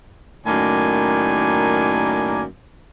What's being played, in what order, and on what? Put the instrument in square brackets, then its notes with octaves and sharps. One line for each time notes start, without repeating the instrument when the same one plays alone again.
[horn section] F#2 A2 D#3 A#3 D5 G#5